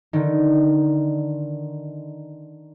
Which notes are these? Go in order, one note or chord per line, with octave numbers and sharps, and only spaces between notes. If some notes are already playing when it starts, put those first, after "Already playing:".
D3 D#3